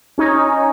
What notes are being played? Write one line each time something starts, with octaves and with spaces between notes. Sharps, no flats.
C#4 D#4